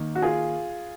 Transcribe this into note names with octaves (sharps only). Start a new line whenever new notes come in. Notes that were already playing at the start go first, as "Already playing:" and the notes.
Already playing: D#3 A#3
F#4
F4 G#4